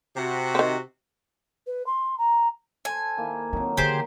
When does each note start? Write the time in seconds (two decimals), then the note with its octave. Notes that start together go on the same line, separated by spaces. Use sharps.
0.16 C3 F#4
0.55 D#3 C4
1.66 B4
1.86 C6
2.18 A#5
2.85 A4 C5 G#5
3.17 D#3 A#3 E4
3.53 D#3 F#3 B3 C4 D#4
3.77 D3 E3 G4 G#4 C5